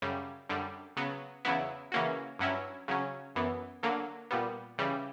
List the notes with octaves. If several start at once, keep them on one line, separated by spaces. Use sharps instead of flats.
F#2 C#3 G3
F#2 D3 G3
C#3 F#3 B3
E2 C#3 F#3 B3 E4
C#3 E3 A#3 C#4 F#4
G2 F#3 C#4 E4
C#3 F#3 C#4
F#2 E3 B3
D3 F#3 A#3
A#2 G3 B3
C#3 E3 G3